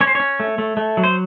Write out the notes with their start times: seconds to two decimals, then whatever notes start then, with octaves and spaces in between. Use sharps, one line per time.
0.01 C#4 C#5
0.07 C5
0.15 C#4 C#5
0.40 A3
0.58 A3
0.77 A3
0.97 F#3
1.04 C5